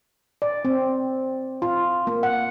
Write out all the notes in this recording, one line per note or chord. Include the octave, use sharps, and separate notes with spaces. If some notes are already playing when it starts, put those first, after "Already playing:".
D5
C4
F4
A#3
F#5